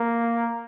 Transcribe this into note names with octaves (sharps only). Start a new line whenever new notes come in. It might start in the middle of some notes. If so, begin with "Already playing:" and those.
Already playing: A#3